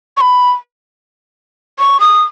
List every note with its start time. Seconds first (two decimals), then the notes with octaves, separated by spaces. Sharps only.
0.17 C#6
0.21 B5
1.79 C#6
2.00 D#6